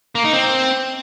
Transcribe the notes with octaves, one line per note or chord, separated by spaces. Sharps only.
A#3
D#4
C4